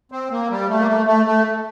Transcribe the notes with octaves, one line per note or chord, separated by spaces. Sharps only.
C4
A#3
G3
A3
A#3
A3
A3
A3